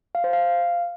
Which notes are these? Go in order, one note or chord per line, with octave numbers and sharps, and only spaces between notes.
F5
C5
F5